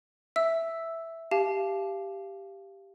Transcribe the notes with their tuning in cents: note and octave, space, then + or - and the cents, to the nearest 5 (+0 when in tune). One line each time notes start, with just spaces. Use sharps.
E5 +0 E6 +0
G4 +0 F5 -20 A5 -35